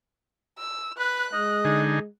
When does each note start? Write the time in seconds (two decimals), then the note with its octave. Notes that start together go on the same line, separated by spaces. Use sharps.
0.58 E6
0.98 B4 F#6
1.33 G#3 D#5
1.65 D3 D#4 G#4